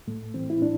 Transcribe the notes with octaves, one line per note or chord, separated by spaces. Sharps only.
A2 A3
E3 C4
E4
A2 D4